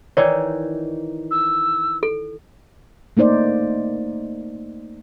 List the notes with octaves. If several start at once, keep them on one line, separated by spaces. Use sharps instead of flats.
D#3 E3 D#4 C#5 D5
E6
A4
A3 A#3 D#4 C5 D5